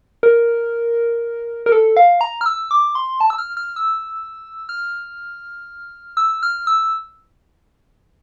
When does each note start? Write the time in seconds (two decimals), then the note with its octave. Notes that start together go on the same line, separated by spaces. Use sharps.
0.23 A#4
1.66 A#4
1.72 A4
1.97 F5
2.21 A#5
2.41 F6
2.46 E6
2.71 D6
2.95 C6
3.21 A5
3.30 E6
3.38 F6
3.57 F6
3.76 E6
4.69 F6
6.17 E6
6.43 F6
6.67 E6